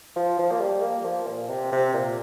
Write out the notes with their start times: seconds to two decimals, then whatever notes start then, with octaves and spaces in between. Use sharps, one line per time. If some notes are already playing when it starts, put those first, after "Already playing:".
0.16 F3
0.39 F3
0.51 A#3
0.61 G3
0.82 A#3
1.05 F3
1.27 A#2
1.50 C3
1.72 C3
1.94 A#2